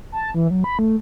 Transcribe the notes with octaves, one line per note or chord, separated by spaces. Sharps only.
A5
E3
F#3
B5
A3